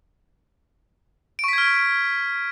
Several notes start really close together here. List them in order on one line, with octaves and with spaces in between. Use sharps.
D7 C#6 B6 G#6 F6